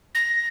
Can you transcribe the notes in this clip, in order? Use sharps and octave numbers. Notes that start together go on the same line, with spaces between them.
A#6